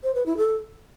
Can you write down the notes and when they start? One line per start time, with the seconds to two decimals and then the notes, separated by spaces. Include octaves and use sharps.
0.03 C5
0.15 B4
0.26 E4
0.37 A4